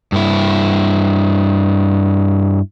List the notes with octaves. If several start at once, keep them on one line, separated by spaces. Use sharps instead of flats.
G2 E4